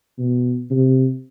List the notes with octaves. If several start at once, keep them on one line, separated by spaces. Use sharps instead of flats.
B2
C3